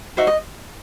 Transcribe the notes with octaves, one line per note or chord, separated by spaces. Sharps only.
D#4 F#4 C5 E5
D#5